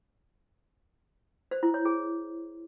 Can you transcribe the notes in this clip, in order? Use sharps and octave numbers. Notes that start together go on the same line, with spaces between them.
C5
E4
C#5
G#4